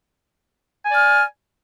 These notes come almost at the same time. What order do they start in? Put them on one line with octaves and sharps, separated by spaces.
G#5 D5 F6